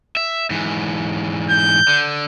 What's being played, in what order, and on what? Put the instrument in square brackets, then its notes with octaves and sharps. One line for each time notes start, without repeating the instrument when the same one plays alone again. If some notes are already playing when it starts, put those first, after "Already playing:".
[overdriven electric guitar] E5
G#2 E3
[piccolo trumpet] G6
[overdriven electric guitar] D3